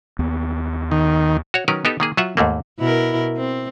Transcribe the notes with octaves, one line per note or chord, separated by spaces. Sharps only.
D#2 B3
D#3
F#4 C#5
D#3 F#3 C#4 A#4 B4
B3 D#4 G4 A4
D#3 A#3 G#4
F#3 F4 E5 F#5
D#2 G#2 A3 A#3
B2 E4 A#4
C4